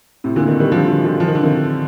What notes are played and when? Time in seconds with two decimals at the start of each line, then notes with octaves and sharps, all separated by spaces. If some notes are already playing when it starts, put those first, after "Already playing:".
0.24 A2 C3
0.36 A#2 D3
0.48 C3 D#3
0.60 D#3 G3
0.72 D3 F3
0.88 D3 F3
1.04 D3 F3
1.20 F3
1.28 D#3
1.35 D3
1.43 C3 D#3